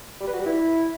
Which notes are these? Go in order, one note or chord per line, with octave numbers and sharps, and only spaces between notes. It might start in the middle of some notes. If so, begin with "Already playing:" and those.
G3
B4
F#4
G3
E4